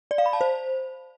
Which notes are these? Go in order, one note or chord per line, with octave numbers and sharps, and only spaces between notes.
D5
F5
B5
A5
C5